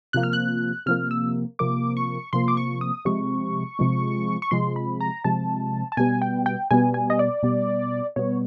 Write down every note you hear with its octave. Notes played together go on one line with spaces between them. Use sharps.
C3 F3 A#3 F#6
F6
F#6
C3 F3 A#3 F6
E6
C3 F3 A#3 D6
C#6
C3 F3 A#3 C6
D6
C#6
D#6
C3 F3 G#3 C#6
C3 F3 G#3
C#6
C3 F3 G#3 C6
B5
A#5
C3 F3 G#3 A5
A5
B2 G3 B3 G#5
G5
G5
B2 G3 B3 G#5
G#5
D#5
D5
B2 G3 B3
B2 G3 B3 C#5